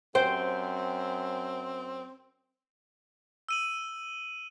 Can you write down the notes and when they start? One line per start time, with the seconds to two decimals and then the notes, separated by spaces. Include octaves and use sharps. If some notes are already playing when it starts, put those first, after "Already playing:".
0.15 F#2 C4 C5 G5
3.49 E6 D#7 F#7